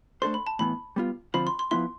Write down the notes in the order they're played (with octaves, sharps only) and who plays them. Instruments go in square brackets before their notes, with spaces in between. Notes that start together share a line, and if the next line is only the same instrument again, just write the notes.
[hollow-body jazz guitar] A3 D4 A4 C5 [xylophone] C6
[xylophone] B5
A5
[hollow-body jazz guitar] A2 E3 B3 [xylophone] B5
[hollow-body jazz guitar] G3 B3 F4
[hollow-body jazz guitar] D3 F3 C4 F4 C5 [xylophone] B5
[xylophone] C6
C6
[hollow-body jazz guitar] F3 B3 E4 [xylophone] C6